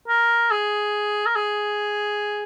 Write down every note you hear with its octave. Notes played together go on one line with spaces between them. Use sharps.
A#4
G#4
A#4
G#4